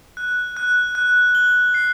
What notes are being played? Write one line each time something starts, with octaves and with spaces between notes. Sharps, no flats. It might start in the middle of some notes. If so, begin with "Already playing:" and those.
F#6
F#6
F#6
G7
C7